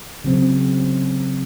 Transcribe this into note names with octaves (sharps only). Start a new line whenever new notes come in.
C#3 F#3 C4